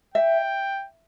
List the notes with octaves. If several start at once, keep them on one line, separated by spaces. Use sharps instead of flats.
E5 G5